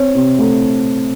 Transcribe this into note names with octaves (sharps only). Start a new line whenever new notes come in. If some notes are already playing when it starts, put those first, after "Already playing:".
Already playing: C4 C#5
C3
A3